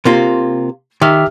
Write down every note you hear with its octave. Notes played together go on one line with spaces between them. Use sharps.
C3 A#3 F4
D#3 G4 E5 F6